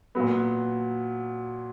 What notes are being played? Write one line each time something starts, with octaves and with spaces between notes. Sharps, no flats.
A#2 F#3 B3